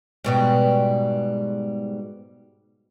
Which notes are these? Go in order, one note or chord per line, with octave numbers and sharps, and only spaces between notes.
G#2 B2 G3